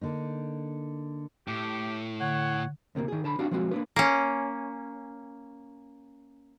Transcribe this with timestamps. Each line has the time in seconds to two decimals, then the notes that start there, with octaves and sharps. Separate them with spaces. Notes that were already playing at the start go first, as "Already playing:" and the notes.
0.01 D3 A#3 D#4
1.48 A2 G4
2.21 D3 C#5 F#5
2.95 D2 C3 A3 A#3
3.08 D#3 G#4
3.24 D3 A5 B5
3.39 C4 D4 F#4 G4 F5
3.51 F3 G#3 C4 F#4
3.71 A#3 D4 B4
3.96 A#3 C#4